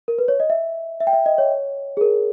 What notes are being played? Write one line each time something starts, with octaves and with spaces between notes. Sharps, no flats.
A#4
B4
C#5
D#5
E5
E5
G5
E5
D#5
C#5
G#4
A#4